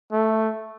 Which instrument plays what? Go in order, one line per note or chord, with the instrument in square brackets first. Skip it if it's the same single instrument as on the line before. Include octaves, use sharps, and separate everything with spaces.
[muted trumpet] A3